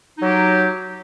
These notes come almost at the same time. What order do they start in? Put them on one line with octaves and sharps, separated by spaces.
D#4 F#3 G4